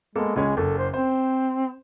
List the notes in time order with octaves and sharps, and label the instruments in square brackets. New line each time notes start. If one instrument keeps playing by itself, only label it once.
[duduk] G#3 [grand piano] A#3 B3 A4
[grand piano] C#2 C#4 G#5 [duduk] G#3
[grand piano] F#1 [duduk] A4
[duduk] C5
[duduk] C4 [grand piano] C5